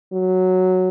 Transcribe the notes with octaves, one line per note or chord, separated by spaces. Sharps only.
F#3